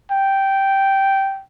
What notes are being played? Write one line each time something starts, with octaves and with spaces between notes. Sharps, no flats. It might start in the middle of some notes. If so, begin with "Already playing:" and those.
G5